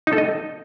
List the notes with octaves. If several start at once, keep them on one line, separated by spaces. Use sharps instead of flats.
D#4
A4
D#5